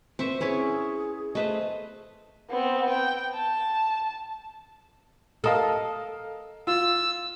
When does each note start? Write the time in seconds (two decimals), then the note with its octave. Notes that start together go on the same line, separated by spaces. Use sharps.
0.19 C4 B4 C5 E5 C#6
0.41 C#4 E4 G#4 B4 C#5
1.35 A3 B4 C5 D#5
2.50 B3 C4
2.90 G5
3.35 A5
5.44 A4 A#4 D#5 F5
6.67 F4 E6